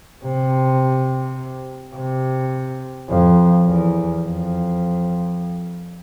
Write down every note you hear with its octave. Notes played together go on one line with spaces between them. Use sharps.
C3
C3
F2
E2
F2